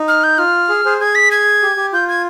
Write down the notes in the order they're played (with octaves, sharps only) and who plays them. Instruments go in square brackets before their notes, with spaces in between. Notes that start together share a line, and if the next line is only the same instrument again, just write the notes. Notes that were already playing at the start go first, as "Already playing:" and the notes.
Already playing: [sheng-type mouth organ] D#4
[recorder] F6
G6
[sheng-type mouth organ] F4 [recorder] F6
[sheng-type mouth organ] G#4
G#4 C5
[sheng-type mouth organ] G#4 [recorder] G#6
[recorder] B6
G#6
[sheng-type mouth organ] G4
G4
[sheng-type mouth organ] F4 [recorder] G6
[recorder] G#6